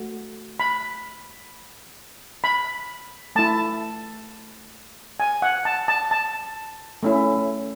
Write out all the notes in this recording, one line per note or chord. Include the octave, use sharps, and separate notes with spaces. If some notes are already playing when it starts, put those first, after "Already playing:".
Already playing: A3 F#4
B5
B5
A3 E4 A5
G#5
F#5
A5
A5
A5
A3 C#4 E4